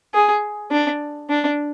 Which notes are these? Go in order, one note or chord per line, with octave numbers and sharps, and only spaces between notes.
G#4
D4
D4